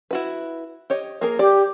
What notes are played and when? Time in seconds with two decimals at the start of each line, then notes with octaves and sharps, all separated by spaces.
0.11 E4 F#4 B4
0.90 G4 C#5 D#5
1.21 A#3 G#4 A#4
1.39 G4 D5